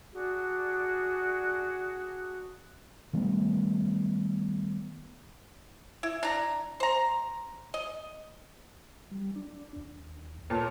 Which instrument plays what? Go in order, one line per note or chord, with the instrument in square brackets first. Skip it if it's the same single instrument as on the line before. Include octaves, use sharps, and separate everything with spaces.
[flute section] D4 F#4 G#4
[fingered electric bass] D#3 G3 A3 B3
[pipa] E4
D4 A#5
C5 A#5
D#5
[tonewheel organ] G3
D4
D#2
[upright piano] A#2 A5 [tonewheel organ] A4 B4 C#5